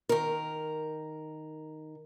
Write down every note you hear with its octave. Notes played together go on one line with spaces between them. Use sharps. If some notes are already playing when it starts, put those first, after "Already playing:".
D#3 A#4